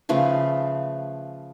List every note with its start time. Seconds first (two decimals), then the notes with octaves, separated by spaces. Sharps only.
0.09 C#3 F3 A3 B4